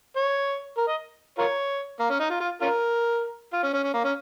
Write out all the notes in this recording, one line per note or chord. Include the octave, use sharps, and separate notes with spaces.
C#5
A#4
D#5
F4 A#4 C#5
A#3
C#4
D#4
F4
F4
C#4 F4 A#4
F4
C#4
C#4
C#4
A#3
C#4